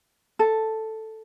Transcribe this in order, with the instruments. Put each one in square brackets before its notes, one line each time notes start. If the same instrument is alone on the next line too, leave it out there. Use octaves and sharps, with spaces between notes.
[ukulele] A4